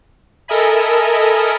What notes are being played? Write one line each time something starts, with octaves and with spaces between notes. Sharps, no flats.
A4 A#4 D#5 E5 G#5 B5